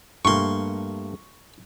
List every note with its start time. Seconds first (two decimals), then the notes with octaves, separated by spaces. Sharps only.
0.25 G2 A3 A#3 C6 C#6